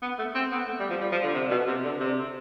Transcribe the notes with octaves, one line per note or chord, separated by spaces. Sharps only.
B3
A3
C4
B3
A3
G3
F3
G3
F3
D3
C3
B2
C3
D3
C3